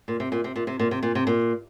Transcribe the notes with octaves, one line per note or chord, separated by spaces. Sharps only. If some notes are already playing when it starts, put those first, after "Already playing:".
A#2
C3
A#2
C3
A#2
C3
A#2
C3
A#2
C3
A#2